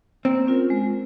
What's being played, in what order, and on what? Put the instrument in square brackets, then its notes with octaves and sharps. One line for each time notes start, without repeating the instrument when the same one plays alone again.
[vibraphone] A#3 [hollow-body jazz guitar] C4
[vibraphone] C#4 F4 A#4
G#3